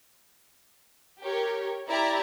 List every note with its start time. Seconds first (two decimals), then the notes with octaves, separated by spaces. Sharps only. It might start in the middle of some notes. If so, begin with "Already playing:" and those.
1.21 G4 A#4 C#5
1.88 E4 G4 D5 E5 A#5